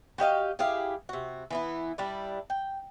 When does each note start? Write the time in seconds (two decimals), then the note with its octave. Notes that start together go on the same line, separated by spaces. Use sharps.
0.18 F#4 G4 D#5 F5
0.59 E4 G4 G#4 F5
1.09 C3 F#4
1.50 E3 B3 E4
1.98 G3 D4 E4
2.50 G5